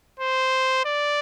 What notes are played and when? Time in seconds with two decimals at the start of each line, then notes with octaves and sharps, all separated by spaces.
0.20 C5
0.85 D5